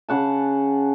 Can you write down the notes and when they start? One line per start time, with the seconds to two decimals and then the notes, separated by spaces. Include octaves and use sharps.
0.09 C#3 F#5 A5